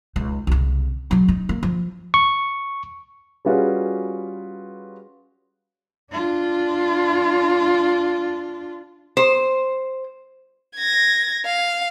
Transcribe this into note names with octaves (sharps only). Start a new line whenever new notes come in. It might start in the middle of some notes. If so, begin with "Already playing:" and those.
C#2 D#4
C2 C#3
C#3 F#3
D#4
A#3
F3
C#6
G3 C#4 F4 F#4 G#4 B4
D4 F4
C5
G#6 A#6
F5